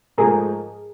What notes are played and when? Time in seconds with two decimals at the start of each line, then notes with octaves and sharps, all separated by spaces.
0.18 G#2 F3 A3 G#4 A#4